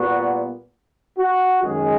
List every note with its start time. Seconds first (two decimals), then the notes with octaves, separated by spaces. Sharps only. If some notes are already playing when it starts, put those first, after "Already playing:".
Already playing: A#2 G3 B3 F#4
1.18 F#4
1.62 F#2 D#3 G#3 G#4